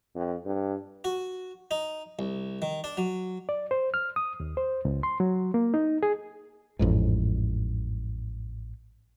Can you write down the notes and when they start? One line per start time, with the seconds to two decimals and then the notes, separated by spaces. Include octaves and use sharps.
0.15 F2
0.46 G2
1.04 F#4
1.71 D#4
2.19 C2
2.62 D#3
2.84 D4
2.97 F#3
3.49 D5
3.71 C5
3.94 F6
4.16 D#6
4.40 D#2
4.57 C5
4.85 C#2
5.03 C6
5.20 F#3
5.54 A#3
5.74 D#4
6.03 G#4
6.79 A1 F2 G#2